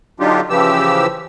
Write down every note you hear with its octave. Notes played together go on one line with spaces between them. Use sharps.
D3 F#3 D4 D#4 F4 G4
C#3 E3 F3 G4 E6